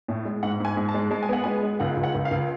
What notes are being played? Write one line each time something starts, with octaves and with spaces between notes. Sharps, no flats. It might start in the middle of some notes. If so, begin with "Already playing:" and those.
A2
G#3
G#2 F#5
G#2 G#5
G#2
A5
G#3
G#3 A5
G#5
B3 F#5
G#3 G#5
G#3
C#2 F#5
C#2
F#5
C#2
F5
C#2